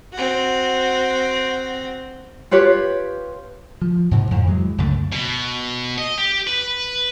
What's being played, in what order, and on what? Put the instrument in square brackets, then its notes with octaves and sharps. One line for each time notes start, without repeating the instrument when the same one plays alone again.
[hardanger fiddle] C4 F#4
[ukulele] F4 G4 B4 C#5
[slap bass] F3
G#2 C3 E3
F2 A2
E3 F#3 G#3
C#2 F#2 D3 A3
[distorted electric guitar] B2
D#5
G4
B4